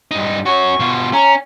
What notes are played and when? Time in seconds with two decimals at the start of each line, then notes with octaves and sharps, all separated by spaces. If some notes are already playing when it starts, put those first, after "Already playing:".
0.11 G2 D#4
0.46 C#4 F#4 C#6
0.80 B2 F4
1.13 C#4 A#5